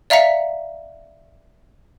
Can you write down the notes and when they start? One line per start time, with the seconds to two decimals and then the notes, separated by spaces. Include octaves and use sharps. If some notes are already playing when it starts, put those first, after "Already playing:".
0.10 D5 E5 F5 A#5 B6 C#7